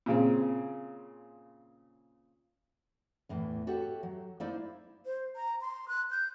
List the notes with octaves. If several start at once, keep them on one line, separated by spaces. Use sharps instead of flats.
A#2 C#3 C4
E2 A2 E3
F#4 G4 A4 C#5 E5 F#5
F#3
A#3 D#4 E4 C5 D5 E5
C5
A#5
C6
F#6
G6